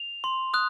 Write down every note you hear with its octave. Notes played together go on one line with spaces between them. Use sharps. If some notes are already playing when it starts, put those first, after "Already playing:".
Already playing: F7
C6
D#6 F#6